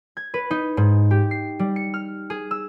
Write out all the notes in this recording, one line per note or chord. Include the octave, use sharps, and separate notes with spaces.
G#6
B4
D#4
G#2
G4
C7
G3
C#7
F6
G#4
E6